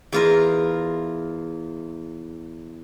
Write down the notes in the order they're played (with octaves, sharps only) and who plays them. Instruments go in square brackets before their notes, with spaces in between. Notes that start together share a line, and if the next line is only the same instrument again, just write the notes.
[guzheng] E2 F4 A#4